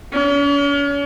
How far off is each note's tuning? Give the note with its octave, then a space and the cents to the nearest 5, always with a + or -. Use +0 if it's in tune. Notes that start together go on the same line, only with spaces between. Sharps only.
C#4 +40